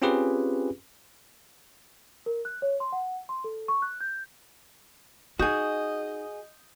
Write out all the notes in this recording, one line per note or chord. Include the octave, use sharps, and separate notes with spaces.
C4 C#4 F4 G4 G#4 B4
A#4
F#6
C#5
C6
F#5
C6
A4
C#6
F#6
G6
D#4 F#4 G#4 D#5 D#6 G6